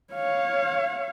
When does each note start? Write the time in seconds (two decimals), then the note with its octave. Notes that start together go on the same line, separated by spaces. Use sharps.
0.13 C#5 F5